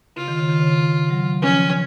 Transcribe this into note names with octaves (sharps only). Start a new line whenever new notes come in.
C#3 F4
D#3
C#3
D#3
C#3
C#3
F#3
F3 C#4